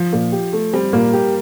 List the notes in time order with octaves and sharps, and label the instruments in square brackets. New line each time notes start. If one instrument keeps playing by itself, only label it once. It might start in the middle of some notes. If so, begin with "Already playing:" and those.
Already playing: [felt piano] F3
[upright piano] A#2
G4
A3
[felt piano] G3 [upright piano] C4
[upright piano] A#2 [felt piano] A#3
[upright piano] G4